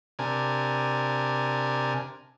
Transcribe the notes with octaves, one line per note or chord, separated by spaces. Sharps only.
C3 D4 A#4 G#5